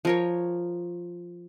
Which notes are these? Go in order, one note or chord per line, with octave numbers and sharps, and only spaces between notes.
F3 A#4 C#5